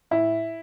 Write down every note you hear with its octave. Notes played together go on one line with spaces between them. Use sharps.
A2 E4